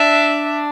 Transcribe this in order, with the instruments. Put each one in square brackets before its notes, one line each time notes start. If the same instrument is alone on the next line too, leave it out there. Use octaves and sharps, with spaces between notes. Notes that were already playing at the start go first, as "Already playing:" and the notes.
Already playing: [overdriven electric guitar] D4 [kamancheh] E5